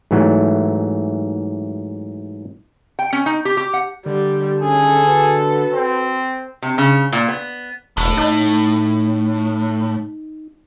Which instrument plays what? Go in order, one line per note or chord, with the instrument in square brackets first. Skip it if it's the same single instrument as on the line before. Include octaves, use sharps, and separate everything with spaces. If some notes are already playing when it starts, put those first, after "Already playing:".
[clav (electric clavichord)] G#2 E3 F#3 A3
[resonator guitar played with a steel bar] G5
C#4
D#4
G4
G4
F#5
[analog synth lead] D3 [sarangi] G3
[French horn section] F#2 D#3 C#4 [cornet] G#4 [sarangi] A4
[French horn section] F#4 B4
[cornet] C4
[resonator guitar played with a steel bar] C3
C#3
A#2
B3
[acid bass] E1 [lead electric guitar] A2
[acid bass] D#4